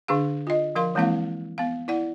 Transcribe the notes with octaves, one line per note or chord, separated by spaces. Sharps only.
D3 D4 G#4 F5
F4 D#5
F3 A#4 F5 C6
E3 G#3 A#3 C4 E4 F5
B3 F5
E4 D5 F#5